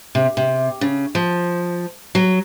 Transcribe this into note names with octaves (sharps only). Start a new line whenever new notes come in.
C3
C3
C#3
F3
F#3